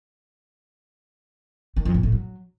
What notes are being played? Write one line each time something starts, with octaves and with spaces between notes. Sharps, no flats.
D#3
F2
A#2
A2
F#3